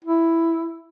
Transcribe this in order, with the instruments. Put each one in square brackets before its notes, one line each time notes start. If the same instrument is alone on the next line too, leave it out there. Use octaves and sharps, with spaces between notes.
[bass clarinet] E4